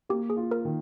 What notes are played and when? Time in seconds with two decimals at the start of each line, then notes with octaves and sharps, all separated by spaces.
0.09 A#3 G4
0.30 G#4
0.37 F4
0.51 A#4
0.65 D#3